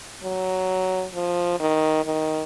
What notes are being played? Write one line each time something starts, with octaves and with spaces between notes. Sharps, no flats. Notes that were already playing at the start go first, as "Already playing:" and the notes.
F#3
F3
D#3
D#3